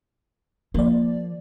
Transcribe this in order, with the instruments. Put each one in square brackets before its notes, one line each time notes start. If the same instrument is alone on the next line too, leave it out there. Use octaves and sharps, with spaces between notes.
[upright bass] F3 [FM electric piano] A#3 D5